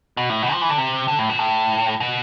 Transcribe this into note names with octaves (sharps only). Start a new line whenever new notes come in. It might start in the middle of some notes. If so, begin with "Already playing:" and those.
B2
A2
B2
F3
E3
D3
C3
D3
A2
B2
A2
B2